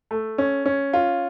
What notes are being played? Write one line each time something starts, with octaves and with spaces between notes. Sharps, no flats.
A3
C#4
C#4
F4